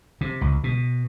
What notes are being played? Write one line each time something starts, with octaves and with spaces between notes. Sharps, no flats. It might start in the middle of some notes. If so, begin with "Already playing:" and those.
C3
C#2
B2